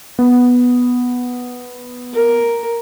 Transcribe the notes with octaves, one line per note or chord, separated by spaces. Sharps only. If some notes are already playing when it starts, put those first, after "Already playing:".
B3
A#4